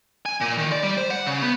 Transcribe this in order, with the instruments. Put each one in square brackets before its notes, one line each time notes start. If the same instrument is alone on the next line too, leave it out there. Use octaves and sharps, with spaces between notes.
[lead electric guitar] G#5
A#2
D#3
D5
G3
C5
F#5
C#3
B3